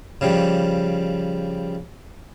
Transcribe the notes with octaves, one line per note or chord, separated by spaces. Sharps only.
C#3 F3 G3